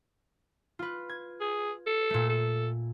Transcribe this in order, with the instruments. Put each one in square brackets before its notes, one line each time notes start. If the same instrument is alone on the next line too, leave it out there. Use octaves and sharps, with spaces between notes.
[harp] F4 B4
G#6
[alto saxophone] G#4
A4
[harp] A#2 A3
[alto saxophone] A4